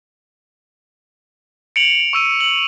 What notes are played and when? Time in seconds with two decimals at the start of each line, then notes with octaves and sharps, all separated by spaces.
1.76 C#7 D7 F7 F#7
2.13 C#6 E6 D#7
2.40 F#7